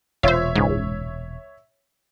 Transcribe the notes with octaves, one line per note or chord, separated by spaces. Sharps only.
E1 A#2 F4 C5 C#5 E5
C#2 G#2